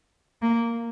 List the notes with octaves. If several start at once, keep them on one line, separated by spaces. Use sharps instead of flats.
A#3